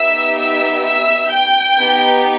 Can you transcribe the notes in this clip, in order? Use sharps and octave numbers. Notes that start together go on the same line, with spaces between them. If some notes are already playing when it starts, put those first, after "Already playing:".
Already playing: B3 D#4 G4 E5 E6
E5 E6
E5 E6
G5 G6
B3 D#4 G4